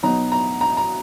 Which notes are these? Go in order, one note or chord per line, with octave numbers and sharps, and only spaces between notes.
B2 F#3 B3 D#4 A#5
A#5
A#5
A#5